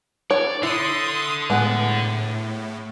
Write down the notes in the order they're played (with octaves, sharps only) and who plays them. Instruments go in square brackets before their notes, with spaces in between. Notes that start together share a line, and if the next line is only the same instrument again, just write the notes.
[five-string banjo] C#5 [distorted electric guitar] D5
[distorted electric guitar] D3 [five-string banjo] E4 [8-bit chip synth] C6 D#6
[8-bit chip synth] A2 [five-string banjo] G#3 B3